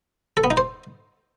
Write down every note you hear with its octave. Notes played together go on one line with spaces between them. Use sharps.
A4
B3
D#4
C5